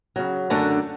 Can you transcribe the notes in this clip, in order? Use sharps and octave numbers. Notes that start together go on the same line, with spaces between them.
C#3 F#3
F#2 D3 A3 D4 F#5 A#5